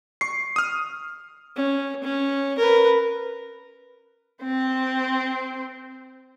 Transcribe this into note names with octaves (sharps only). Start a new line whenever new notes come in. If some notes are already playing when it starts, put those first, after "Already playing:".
C#6 C7
D#6 F6
C#4
C#4
A#4 B4
C4 C5